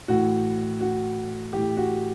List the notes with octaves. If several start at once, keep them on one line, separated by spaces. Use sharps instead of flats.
A2 E3 F#4
F#4
A2 E3 G4
F#4